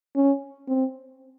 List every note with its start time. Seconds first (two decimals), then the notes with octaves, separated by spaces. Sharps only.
0.16 C#4
0.68 C4